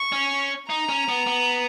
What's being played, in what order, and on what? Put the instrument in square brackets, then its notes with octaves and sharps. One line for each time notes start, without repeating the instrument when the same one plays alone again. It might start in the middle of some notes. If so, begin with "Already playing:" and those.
Already playing: [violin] C#6
[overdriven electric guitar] C#4
[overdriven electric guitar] D#4 [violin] A#5
[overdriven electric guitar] C#4
B3
B3